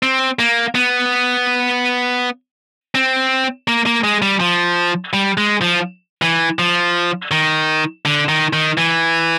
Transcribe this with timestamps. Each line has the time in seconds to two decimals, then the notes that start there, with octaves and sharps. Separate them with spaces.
0.03 C4
0.39 A#3
0.75 B3
2.95 C4
3.68 A#3
3.86 A#3
4.04 G#3
4.22 G3
4.40 F3
5.13 G3
5.38 G#3
5.61 F3
6.22 E3
6.59 F3
7.31 D#3
8.05 D3
8.29 D#3
8.53 D#3
8.78 E3